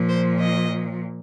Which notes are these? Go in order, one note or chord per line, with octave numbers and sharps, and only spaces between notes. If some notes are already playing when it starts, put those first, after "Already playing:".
Already playing: A#2 F3
C5
D#5